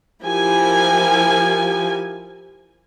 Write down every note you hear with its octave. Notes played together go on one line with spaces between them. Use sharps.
F3 E4 G4 A#4 G#5